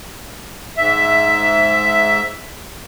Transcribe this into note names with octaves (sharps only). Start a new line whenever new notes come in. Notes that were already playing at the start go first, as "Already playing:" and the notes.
G#2 E5